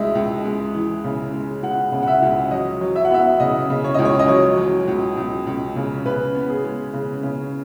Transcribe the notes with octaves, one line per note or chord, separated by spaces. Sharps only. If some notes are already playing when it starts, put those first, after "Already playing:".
Already playing: C#2 G#3 D#5 E5
C#2
G#3
E3
C#3
G#3
C#2 F#5
C#3
F#5
E5
C#2
F#3 D#5
F#3
E5
F#5
B3 E5
C#3 D#5
C#3
C#5
C#2 D#5
C#5
D#5
F#3 C#5
F#3
C#2
C#2
C#2
C#3
C#3 B4
B3
G#4
G#3
C#3
C#3